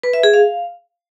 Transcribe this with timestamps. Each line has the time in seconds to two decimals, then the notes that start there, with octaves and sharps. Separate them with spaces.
0.03 B4
0.13 E5
0.23 G#4
0.33 F5